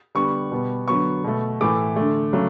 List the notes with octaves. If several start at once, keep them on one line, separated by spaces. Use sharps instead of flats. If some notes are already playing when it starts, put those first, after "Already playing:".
D3 G3 B3 C#6
B2 G3 B3
D3 F#3 B3 C#6
B2 A3
A2 E3 A3 D6
D3 A3
C#3 F#3 A3